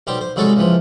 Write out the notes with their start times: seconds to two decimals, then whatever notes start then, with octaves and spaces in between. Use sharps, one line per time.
0.07 B1 G3 G4 C5
0.21 C5
0.36 C2 F#3 G#3 A4 B5 C#6
0.56 C#2 E3 F3